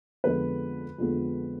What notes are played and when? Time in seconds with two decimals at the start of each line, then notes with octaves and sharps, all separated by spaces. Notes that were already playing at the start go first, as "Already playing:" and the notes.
0.24 F2 D3 F3 G#3 B3 B4
0.98 F2 D3 F3 G#3 B3